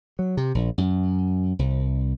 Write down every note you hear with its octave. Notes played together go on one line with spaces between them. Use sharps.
F#3
C3
A#1
F#2
C2